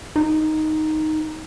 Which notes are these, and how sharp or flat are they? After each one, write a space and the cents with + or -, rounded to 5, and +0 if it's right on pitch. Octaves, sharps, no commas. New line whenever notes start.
D#4 +0